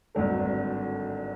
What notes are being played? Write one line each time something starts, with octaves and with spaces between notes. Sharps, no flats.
G#1 G2 D3 F#3 A3